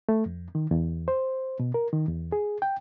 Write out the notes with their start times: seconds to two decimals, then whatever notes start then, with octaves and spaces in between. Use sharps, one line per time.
0.09 A3
0.26 F2
0.55 D#3
0.71 E2
1.08 C5
1.60 B2
1.74 A#4
1.93 D#3
2.09 E2
2.32 G#4
2.62 G5